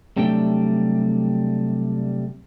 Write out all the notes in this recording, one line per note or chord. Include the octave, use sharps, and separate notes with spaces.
C3 F#3 G3 A3 D4 G5